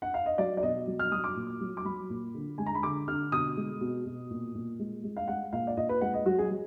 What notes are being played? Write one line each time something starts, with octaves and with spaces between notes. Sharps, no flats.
F#5
F5
D#5
F#3 D5
D5
B2 D#5
F#3
F6
F#3 D#6
D6
A#2
F#3
D6
F#3 B5
A#2
D3
G#3 G#5
A#5
B5
D3 D6
D3 F6
B2 D#6
G#3
B2
B2
A#2
A#2
G#3
G#3
F5
G#3 F#5
A#2 F5
D5
A#2 D#5
B4
G#3 F#5
D#5
F#3 F#4
G#4
F#3